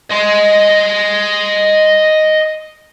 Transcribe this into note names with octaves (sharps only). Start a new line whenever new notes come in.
D#5 C6